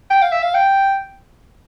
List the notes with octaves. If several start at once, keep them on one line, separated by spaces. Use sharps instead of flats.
G5
F5
E5
F5
G5